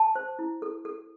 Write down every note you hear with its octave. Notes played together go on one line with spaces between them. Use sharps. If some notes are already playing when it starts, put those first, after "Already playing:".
Already playing: A5
C5
E4
A4
A4